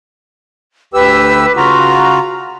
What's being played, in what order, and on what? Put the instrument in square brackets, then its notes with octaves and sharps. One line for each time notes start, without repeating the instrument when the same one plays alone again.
[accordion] D2 G4 E6 [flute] B4
[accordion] C#3 F4 F#4 [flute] A#5